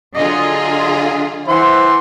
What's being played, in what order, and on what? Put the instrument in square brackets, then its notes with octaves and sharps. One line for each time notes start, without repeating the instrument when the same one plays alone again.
[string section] D3 F4 G#4 [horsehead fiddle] F#3 D#5
[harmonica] E3 C6 [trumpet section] C5 E5 [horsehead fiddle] F#5